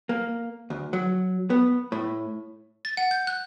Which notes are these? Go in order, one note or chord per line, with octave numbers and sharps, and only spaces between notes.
A#3
D2
F#3
B3
A2
A6
F#5
G6
F#6